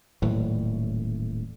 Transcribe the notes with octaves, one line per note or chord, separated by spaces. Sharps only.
D#1 A2 E3 F#3